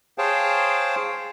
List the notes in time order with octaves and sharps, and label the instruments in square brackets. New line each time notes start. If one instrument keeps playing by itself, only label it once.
[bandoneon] G#4 C5 C#5 F5 G5 A5